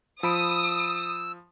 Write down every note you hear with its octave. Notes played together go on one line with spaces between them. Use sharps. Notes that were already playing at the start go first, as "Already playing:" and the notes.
F3 B5 D#6 E6 D7